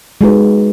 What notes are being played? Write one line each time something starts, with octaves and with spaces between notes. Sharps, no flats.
G#3 D#4 F#4 B4